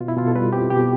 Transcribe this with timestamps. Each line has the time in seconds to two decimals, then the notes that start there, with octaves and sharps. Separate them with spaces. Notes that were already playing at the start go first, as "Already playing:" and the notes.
0.01 B2 F4
0.08 E4
0.17 B2 F4
0.27 A4
0.35 G3 B4
0.53 C4 G4
0.70 B2 G4